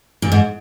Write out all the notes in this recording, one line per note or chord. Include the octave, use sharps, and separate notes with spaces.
A#2
G#2